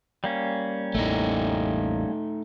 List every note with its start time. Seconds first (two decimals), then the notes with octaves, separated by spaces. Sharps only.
0.24 G3 A#3 C#4
0.95 A1 E2 A2 A3 D#4